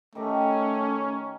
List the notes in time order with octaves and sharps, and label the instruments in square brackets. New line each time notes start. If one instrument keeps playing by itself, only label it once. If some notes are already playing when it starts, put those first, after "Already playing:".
[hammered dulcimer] D#3 G4 A#5 [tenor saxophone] A3 [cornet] C#4